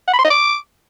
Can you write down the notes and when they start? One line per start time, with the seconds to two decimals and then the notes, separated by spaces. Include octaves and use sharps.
0.08 F#5
0.13 B5
0.19 C6
0.25 D#5
0.30 D6